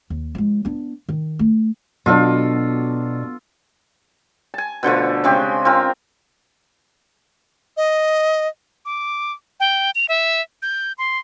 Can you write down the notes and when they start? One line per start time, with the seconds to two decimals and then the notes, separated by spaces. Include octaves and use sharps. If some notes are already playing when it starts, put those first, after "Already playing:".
0.10 D#2
0.35 F3 G#3
0.65 B3 D4
1.09 D#3
1.39 A3
2.06 B2 F#3 D4 F4 A4
4.54 G#5 A5
4.83 B2 D3 F3 A3
5.24 C#3 G#3 C4 G4
5.65 C4 F4 A#4
7.77 D#5
8.85 D6
9.60 G5
9.95 F7
10.09 E5
10.62 G6
10.98 C6